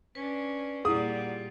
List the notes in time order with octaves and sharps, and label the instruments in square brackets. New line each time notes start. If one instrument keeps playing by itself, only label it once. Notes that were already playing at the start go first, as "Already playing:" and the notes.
[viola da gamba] C#4 D4 [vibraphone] B4
[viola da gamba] A#2 G3 F4 [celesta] E4 G#4 [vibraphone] F#5 [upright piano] D#6